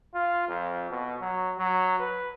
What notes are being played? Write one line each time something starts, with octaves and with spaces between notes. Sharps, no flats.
F4
F2
B2
F#3
F#3
B4